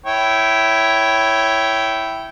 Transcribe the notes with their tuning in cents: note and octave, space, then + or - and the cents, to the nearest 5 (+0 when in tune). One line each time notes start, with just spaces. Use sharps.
E4 +0 C#5 +0 G5 -15